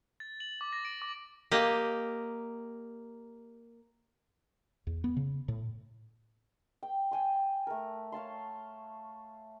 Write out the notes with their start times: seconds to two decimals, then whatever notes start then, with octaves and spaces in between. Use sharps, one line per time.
0.20 A6
0.40 F#7
0.61 D6
0.73 A#6
0.85 D7
1.02 D6
1.51 A#3 G4 D#5
4.87 E2
5.04 B3
5.16 C#3
5.48 A2
6.83 G5
7.11 G5 G#5 C6
7.67 A3 A#4
8.12 C#5 F5 A5 C6